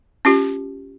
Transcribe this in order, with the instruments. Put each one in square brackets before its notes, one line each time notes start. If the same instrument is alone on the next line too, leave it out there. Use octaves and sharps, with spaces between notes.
[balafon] C#4 F4 G4